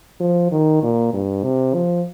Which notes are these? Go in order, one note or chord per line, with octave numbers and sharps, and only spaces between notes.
F3
D#3
A#2
G2
C3
F3